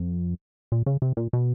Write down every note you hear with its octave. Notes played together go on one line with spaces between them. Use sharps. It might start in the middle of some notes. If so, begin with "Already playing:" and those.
Already playing: F2
A#2
C#3
C3
A#2
B2